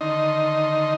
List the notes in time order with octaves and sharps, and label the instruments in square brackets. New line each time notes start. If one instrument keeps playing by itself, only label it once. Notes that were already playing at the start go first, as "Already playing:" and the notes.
[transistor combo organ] D3 D#3 D#4 D#5 C6